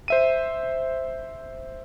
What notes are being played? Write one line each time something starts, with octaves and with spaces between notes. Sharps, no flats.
C5 E5 D#7